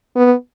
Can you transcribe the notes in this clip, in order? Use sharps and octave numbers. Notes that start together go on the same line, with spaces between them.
B3